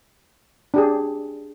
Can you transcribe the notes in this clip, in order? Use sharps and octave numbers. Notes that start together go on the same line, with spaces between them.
D4 G4 G#4